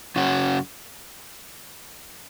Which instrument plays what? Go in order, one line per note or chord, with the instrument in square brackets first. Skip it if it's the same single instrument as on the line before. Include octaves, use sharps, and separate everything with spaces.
[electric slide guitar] F#2 C#3 F#3 C#4 F#4